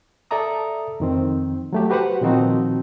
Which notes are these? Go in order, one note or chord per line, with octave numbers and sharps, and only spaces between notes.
A4 D5 E5 A#5 D#6
F2 D#3 C4
F#3 A3 G4
F#4 G4 B4 C5 F#5
A#2 D#3 F3 C4 D#4 F#4